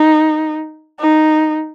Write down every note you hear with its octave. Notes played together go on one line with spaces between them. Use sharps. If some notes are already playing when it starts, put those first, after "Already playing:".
Already playing: D#4
D#4